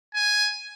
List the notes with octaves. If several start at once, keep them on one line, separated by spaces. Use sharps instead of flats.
G#5